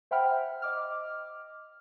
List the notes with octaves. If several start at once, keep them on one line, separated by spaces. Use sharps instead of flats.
C5 E5 F#5 G5 B5 F6
D#5 D6 F6